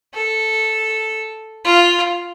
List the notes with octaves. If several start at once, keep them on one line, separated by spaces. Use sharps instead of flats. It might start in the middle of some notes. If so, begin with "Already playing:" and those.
A4
F4